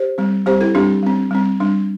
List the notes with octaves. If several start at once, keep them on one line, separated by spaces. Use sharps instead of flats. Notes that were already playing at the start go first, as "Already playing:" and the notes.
Already playing: G4 C5
G3 C4
G3 C4 G4 C5
E4 A4
G3 C4 D4 G4
G3 C4
G3 C4
G3 D4